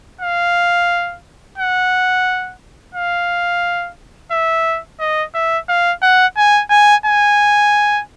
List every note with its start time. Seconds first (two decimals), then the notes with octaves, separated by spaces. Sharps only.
0.21 F5
1.58 F#5
2.94 F5
4.31 E5
4.99 D#5
5.34 E5
5.69 F5
6.02 F#5
6.38 G#5
6.71 G#5
7.06 G#5